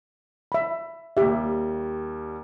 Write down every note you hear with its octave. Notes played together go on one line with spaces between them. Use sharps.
E5 B5
D#2 G3 G4 E5